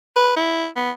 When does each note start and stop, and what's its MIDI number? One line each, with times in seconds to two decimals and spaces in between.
0.16 0.32 71
0.37 0.67 64
0.76 0.91 59